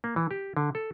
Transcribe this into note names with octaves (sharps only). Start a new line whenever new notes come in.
A#3
E3
G4
D3
A4